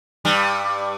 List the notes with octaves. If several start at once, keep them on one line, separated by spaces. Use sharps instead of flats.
G2 G3